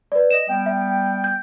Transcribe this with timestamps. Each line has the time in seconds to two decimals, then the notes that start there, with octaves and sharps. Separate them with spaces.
0.12 B4 D5
0.30 D#5 E7
0.49 G3 B3 G5
0.66 E5
1.24 G6